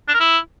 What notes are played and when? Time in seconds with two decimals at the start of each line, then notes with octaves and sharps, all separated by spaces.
0.08 D4
0.14 A#4
0.20 E4